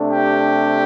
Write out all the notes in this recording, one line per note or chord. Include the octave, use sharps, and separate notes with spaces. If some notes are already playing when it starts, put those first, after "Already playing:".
Already playing: C3 A3 D4
G4